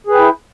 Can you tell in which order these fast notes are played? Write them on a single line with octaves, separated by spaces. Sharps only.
G#4 B4 G5 E4